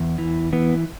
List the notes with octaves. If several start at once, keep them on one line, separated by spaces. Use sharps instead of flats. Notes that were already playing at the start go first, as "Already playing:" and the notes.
Already playing: E2
E3
E3 B3